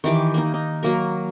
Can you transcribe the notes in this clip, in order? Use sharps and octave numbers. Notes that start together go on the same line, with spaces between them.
D#3 E3 G4 D6
A#3 D#4
D#4
F#3 A#3 A#4